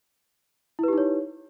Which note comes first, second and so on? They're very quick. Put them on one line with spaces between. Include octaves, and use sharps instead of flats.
E4 B4 G4 D#4 C#5